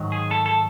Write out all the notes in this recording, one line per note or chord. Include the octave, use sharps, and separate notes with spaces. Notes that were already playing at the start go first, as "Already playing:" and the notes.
Already playing: G#2 D#3 F#3
G#4
A4
A4